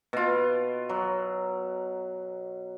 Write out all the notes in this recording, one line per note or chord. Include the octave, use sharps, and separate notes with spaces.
B2 F4
F#3